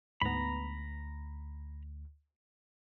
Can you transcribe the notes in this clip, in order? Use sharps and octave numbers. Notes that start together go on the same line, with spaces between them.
D2 G#2 B3 A#5 B5